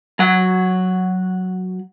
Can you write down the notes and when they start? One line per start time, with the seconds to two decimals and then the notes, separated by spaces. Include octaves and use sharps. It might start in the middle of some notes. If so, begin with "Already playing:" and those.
0.19 F#3 F#5